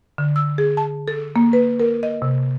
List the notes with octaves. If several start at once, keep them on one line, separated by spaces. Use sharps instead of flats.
D3
E6
G#4
A5
A4
A#3
B4
A#4
D#5
C3